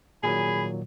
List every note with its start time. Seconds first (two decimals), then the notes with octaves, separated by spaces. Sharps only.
0.23 A#2 D#3 F#3 G#4 G#5 B5